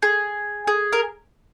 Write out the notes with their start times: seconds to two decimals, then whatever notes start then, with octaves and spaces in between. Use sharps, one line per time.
0.02 G#4
0.67 G#4
0.92 A#4